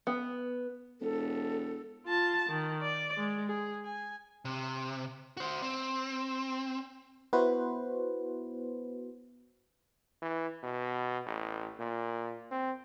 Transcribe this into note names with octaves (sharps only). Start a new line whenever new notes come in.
B3
E1 A4
F4 A5
D#3
D5
G#3
G#4
G#5
C3
F#4 C5
C4
B3 E4 F#4 B4 C5
E3
B2
A1
A#2
C4